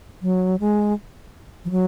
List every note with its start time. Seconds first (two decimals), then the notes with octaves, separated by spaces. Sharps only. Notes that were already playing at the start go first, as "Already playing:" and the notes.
0.22 F#3
0.60 G#3
1.65 F3
1.71 F#3